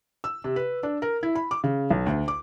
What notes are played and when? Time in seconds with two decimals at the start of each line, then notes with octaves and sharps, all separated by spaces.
0.24 E6
0.44 C3
0.56 B4
0.83 D4
1.02 A#4
1.23 E4
1.36 B5
1.51 D6
1.64 C#3
1.90 B1
2.06 D2
2.28 D6